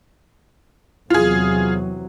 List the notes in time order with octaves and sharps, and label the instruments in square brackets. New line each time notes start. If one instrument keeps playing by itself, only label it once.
[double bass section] E2 C3 F#3 [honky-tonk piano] F4 G#4